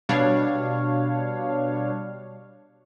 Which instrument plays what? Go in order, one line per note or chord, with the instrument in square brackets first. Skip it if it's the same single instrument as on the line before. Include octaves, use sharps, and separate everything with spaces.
[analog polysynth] B2 G3 D4 C#5 F5